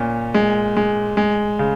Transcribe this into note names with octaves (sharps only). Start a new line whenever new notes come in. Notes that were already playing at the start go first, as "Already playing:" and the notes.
Already playing: A#2 C#4
G#3
G#3
G#3
C#3